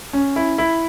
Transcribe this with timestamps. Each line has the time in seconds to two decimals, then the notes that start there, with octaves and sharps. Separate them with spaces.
0.13 C#4
0.36 E4
0.58 E4